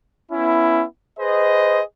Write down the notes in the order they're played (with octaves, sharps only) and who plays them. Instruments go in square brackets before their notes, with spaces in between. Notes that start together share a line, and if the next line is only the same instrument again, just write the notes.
[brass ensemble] B3 C#4 E4
G#4 B4 C5 D#5